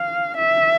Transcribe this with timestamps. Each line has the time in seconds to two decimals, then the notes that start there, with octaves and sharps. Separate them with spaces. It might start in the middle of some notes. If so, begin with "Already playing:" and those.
Already playing: F5
0.37 E5